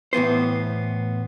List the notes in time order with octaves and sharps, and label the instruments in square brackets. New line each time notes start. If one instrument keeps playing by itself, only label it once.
[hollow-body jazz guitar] A2 E3 B3 C5